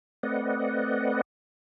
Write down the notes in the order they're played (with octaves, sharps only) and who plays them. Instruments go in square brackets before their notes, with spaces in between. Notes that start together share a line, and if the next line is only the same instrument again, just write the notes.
[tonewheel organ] A3 C4 B4 D5 D#5 F#5